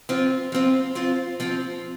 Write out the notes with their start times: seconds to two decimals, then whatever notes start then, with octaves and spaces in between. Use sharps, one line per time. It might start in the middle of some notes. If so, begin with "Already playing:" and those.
0.09 F3 C4 F4
0.52 F3 C4 F4
0.95 F3 C4 F4
1.40 F3 C4 F4